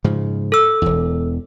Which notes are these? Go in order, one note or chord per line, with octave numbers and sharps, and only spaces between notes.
G#2 C#3 F3
A4 E6
E1 E2